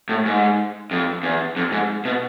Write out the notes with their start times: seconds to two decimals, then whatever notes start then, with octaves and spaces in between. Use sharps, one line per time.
0.09 A2
0.26 G#2
0.91 F2
1.23 E2
1.57 F2
1.72 G#2
2.05 B2